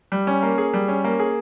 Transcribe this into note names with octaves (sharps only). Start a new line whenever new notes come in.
G3
C#4
A#3
G#4
G3
C#4
A#3
G#4